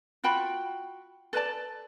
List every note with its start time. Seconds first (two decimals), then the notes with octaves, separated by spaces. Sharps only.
0.24 F4 F#4 G5 B5
1.33 A4 B4 D5 A5